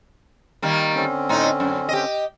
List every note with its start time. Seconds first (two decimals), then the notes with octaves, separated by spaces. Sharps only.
0.62 D#3 G3 A#3
0.95 D3 C4 C#4
1.29 A2 D#4
1.60 F#2
1.89 G4 D#5